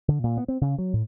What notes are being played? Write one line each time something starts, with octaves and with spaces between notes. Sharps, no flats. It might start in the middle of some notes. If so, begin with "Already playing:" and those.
D3
A#2
B3
C4
C#3
F#3
A2